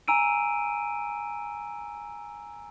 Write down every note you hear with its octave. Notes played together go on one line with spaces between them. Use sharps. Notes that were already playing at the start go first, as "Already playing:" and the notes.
G#5 A#5 E6 D7 D#7